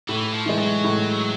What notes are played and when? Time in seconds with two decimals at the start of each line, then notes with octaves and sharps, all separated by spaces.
0.09 A2 E3
0.34 F3
0.46 E3 G#3
0.59 F#3
0.84 A2